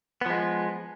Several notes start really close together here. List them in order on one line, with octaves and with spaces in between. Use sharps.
B3 F3 G#3